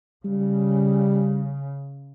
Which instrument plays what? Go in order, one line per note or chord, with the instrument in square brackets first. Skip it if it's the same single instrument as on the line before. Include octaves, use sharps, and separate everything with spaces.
[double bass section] C#3 [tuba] G3